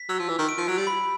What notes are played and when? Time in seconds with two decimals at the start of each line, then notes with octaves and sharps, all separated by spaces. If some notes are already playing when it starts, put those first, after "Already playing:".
Already playing: B6
0.09 F#3 E6
0.19 F3
0.29 E3 E6
0.39 D#3
0.49 D7
0.58 F3
0.68 F#3 D7
0.78 G3
0.87 B5